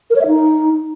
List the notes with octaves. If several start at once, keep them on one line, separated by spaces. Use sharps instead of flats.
A#4
C#5
E5
D#4